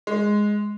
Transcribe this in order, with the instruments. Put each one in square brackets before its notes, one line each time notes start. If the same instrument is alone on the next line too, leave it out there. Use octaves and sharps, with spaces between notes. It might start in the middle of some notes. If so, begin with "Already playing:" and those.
[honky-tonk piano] G#3